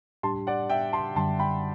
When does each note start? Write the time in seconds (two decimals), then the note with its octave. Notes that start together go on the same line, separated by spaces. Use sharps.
0.23 A2 G3 D4 G4 A5 C6
0.47 D5 F#5
0.70 E5 G5
0.93 A5 C6
1.16 F#2 D3 G3 A5 C6
1.40 G5 B5